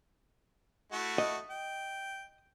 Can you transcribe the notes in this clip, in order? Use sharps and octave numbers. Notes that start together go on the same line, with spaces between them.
A3 E4 F#4
D#5
G5